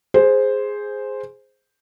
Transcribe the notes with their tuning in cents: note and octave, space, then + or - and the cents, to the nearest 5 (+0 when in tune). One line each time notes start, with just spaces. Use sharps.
G#4 +0 C5 +0